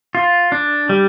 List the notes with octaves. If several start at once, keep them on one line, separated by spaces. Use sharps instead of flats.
F4
D4
G3